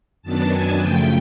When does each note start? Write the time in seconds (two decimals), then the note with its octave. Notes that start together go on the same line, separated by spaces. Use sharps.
0.22 F#2 D#3 F#3 B3 D4 A5
0.51 G#5
0.80 F#2 C#3 F3 A3 G5